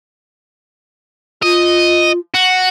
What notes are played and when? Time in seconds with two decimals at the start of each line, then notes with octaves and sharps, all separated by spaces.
1.43 F4 D#5
2.34 F#4